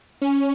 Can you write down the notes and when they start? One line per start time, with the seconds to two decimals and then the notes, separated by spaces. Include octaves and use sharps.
0.22 C#4